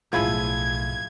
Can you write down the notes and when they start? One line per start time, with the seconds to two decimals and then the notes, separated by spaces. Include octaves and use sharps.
0.13 B1 A2 F3 E4 G#4 G#6